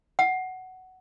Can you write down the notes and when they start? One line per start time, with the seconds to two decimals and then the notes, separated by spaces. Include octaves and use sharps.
0.19 F#5